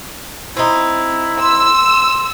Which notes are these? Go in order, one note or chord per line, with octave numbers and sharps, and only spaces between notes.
C4 D#4 E4
C6 E6